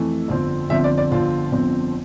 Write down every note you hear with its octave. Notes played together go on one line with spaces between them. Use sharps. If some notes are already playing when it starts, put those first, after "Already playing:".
Already playing: F2 E3 A3
G1 F2 D3 F3 C4
G1 F2 D3 F3 C4 E5
D5
D5
G1 F2 D3 F3 C4 F4
G1 F2 D3 F3 C4